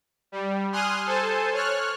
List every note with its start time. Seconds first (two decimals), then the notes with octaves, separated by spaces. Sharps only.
0.32 G3
0.72 G#5 C6 D#6 F6 F#6
1.05 A4 C5 G#5 A5
1.53 C#5 F6 F#6